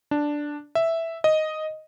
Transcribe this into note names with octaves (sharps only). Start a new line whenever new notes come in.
D4
E5
D#5